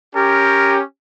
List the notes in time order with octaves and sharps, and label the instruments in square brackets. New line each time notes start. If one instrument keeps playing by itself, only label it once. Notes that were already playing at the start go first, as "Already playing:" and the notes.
[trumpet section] C#4 G4 [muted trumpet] A#4